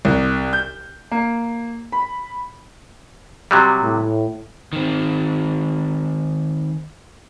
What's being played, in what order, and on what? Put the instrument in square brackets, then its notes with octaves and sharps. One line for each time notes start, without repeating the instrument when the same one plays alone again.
[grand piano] C2
G6
A#3
B5
[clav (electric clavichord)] C3 F#3 G3
[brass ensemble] A2
[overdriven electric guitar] D#3 C4